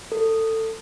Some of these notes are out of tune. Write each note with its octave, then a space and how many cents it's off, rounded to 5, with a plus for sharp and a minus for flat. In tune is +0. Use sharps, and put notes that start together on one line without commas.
A4 +20